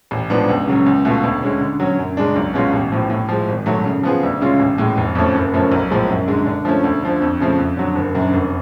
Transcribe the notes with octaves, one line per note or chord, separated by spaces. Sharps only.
A1
G#2 F3 B3 D4
C#2
C#3 F#3 C#4
C#2
B2 A3 F4
D2
D3 G#3 C#4
D3
F#3 C#4
F#2
C#3 G#3 D4
B1
B2 G#3 C#4 F4
A1
A2 F3
A2
F3 G#3
G#1
G#2 F#3 A3
C#3
F3 B3 F4 G#4
D2
C#3 G#3 C#4 F4
A1
A2 G#3
F1
F2 F3 A3 C#4
F#1
F#2 F3 A3 C#4
B1
A2 F3 G#3
F#2
D3 G#3
D3
F3 A3 C#4
D2
D3 F3
F2
C#3 F3 A3
F2
D3 F#3
F#1
F#2 D3
F1